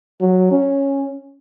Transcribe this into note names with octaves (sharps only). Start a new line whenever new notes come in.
F#3
C#4